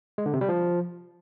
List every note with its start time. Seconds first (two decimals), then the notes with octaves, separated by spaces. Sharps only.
0.18 G#3
0.26 D3
0.33 C3
0.41 G3
0.49 F3